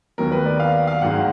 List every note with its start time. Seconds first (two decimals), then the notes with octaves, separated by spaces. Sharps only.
0.18 D#2 D#3 F#3 B3 A#4
0.32 B4
0.46 D5
0.60 F5
0.87 F5
1.01 G#1 G#2 D#3 F#3 F#5